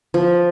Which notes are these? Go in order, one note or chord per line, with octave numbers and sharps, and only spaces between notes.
F3